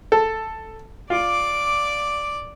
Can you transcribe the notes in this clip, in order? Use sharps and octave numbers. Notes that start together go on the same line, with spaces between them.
A4
F4 D5 D6